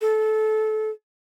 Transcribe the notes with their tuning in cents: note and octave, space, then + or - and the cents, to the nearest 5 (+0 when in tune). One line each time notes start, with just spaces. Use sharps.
A4 -20